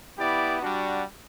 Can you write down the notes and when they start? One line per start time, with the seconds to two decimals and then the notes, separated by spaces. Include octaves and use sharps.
0.18 B3 E4 G4 D5
0.61 G3 D4 F#4